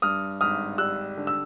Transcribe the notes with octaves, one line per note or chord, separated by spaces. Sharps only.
G2 D#6 F6
G#1 D#6 F6
G3 E6 F#6
D3
E6